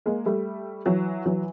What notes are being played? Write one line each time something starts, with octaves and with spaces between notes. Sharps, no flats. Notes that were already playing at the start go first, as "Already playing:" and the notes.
G#3 A#3
G3 A3
E3 F#3
E3 F#3